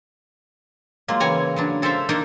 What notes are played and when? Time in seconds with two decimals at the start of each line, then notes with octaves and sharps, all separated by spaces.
1.08 F#3 G#3 A#3 F4
1.20 C#3 E3 G#3 C#5 G#5 A#5
1.56 C#3 F#3 D4
1.82 G#3 A4 A#4 C5 E5 F5
2.09 A#3 D4 D#4 A#4 D#5